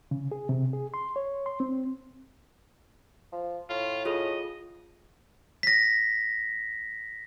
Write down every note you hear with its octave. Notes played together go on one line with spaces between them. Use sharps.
C#3
G#4
C3
G#4
C6
C#5
C6
C4
F3
A2 F4
F4 G#4 A4 D#5
A#6 B6